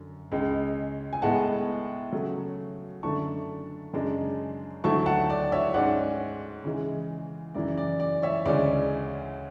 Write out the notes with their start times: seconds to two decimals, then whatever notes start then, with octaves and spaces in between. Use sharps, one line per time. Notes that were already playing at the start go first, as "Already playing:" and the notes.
Already playing: F#2 D3
0.32 C#2 C#3 G#3
1.13 G#5
1.22 A2 G#3 B3 F#5 A5
2.12 C#3 F#3 A3
3.03 F#2 D3 A3 D4 A5 C#6
3.93 F#2 C#3 G#3 D4
4.84 D2 D3 F#3 A3 E4 A5 C#6
5.06 F#5 A5
5.30 D5
5.52 C#5 E5
5.74 G#2 G#3 C#4 D5 F#5
6.64 C#3 E3 G#3
7.54 F#2 C#3 E3 D5
7.77 D5
8.00 D5
8.22 C#5 E5
8.45 D2 C#3 G#3 C#4 E4 D5